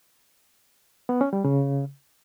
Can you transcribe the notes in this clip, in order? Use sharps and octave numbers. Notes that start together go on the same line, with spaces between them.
B3
C#4
G3
C#3